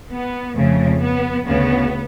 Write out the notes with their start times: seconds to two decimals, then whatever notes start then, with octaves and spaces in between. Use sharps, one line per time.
0.11 B3
0.56 F2 C#3 A3
1.01 B3
1.46 D2 C#3 B3